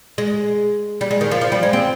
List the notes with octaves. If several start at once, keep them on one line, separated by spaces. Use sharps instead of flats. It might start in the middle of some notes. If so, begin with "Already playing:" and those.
G#3
G3
G#3
D#3
F3
F3
G3
G#3
C4